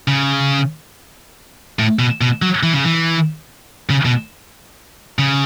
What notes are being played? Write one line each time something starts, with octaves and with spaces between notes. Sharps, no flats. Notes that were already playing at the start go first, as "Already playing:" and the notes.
C#3
A2
B2
B2
F#3
E3
C#3
E3
C#3
B2
C#3